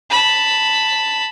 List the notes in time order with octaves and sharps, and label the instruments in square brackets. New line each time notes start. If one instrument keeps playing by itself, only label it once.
[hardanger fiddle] A5 B5